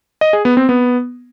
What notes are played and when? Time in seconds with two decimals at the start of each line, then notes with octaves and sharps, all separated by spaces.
0.21 D#5
0.33 G#4
0.45 B3
0.57 C4
0.69 B3